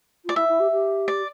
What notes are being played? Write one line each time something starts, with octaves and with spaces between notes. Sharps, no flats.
F4 D5
E4 E5
E4
G4
G4
D5